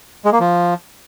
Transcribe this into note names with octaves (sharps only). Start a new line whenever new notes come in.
G#3
A#3
F3